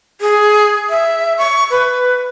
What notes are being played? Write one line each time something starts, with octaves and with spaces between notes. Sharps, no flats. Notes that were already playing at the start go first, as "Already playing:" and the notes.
G#4
E5
C#6
B4